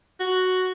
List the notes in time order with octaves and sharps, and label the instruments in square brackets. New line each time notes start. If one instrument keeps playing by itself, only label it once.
[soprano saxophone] F#4